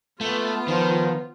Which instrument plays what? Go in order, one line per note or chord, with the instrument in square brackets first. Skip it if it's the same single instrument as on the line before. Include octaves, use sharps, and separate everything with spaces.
[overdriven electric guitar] A3 [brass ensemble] B3 [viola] F4
[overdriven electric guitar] D#3 [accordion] F3